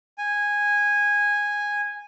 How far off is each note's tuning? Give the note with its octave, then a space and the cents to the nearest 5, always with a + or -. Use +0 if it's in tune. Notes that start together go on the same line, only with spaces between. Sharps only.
G#5 -10